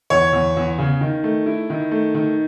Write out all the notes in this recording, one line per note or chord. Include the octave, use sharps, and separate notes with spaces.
E2 C#5
E2
E2
C#3
D#3
A3
E4
D#3
A3
D#3